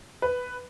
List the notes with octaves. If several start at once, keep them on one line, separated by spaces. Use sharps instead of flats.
B4